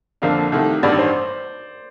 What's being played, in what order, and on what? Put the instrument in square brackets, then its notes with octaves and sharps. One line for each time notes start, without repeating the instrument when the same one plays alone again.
[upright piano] F2 D3 F3 A#3 D4 [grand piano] F5
[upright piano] C2 C3 D#3 A3
[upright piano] A1 G2 D#3 G3 [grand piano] D5
[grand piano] C5